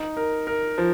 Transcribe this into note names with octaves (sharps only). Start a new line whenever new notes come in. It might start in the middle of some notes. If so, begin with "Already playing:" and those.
Already playing: D#4
A#4
A#4
F3